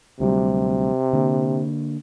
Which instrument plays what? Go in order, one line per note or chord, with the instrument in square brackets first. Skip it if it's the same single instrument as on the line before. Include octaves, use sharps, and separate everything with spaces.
[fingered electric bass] D2 F#3 G3 [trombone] C3
[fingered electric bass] D3 A#3